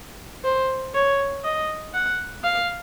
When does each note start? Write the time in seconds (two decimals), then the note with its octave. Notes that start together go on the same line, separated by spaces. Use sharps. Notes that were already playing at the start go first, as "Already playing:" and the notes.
0.44 C5
0.95 C#5
1.44 D#5
1.94 F#5
2.44 F5